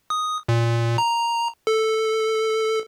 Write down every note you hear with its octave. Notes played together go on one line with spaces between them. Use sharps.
D#6
A#2
A#5
A4